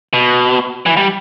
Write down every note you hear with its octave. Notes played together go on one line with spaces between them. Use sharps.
B2
E3
G3